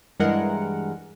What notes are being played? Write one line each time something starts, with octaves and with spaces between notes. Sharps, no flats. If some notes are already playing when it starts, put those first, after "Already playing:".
G2 E3 G#3 A#4 F#5